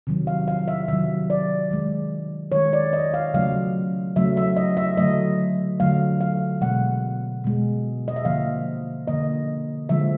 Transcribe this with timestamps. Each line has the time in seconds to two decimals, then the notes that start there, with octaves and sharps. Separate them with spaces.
0.07 C3 D#3 F#3
0.27 F5
0.48 F5
0.68 E5
0.88 C3 D#3 F#3 E5
1.30 D5
1.71 D#3 G#3
2.52 D#3 G#3 C#5
2.73 D5
2.93 D#5
3.14 F5
3.34 C#3 F#3 A3 F5
4.16 C#3 F#3 A3 E5
4.37 E5
4.56 D#5
4.77 E5
4.97 D3 F#3 A3 D#5
5.80 D3 F#3 A3 F5
6.21 F5
6.61 B2 G#3 F#5
7.44 B2 G#3
8.08 D#5
8.16 E5
8.25 D3 F3 A#3 F5
9.07 D3 F3 A#3 D#5
9.89 D3 F3 G#3 E5